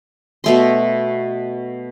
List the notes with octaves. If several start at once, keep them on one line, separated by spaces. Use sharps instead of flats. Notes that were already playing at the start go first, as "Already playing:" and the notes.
B2 A3 C6